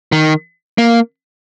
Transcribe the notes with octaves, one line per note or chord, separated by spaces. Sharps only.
D#3
A#3